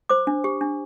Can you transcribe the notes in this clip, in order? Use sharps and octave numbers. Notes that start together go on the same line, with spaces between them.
C5 D6
D4
G4
D4